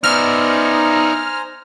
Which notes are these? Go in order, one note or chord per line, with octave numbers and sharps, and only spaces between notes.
B3 D#4 C5 D5 E5 G#5 A#5 F6